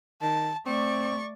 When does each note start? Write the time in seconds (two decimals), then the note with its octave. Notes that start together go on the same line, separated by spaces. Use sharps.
0.22 D#3 A5
0.66 A3 C4 D5 C#6